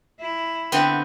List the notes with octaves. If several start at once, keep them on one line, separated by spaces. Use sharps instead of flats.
E4
D3 B3 C4